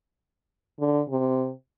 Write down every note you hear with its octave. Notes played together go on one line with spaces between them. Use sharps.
D3
C3